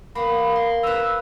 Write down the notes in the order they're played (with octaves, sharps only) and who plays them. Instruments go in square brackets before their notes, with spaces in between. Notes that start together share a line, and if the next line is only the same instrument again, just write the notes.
[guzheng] A#3 B3 [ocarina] B5
[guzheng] C6
[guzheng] B4 A#5 [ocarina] E6